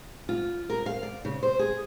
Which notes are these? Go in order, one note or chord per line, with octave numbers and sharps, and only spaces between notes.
F4
A#4
F5
D5
C#3
C5
G#4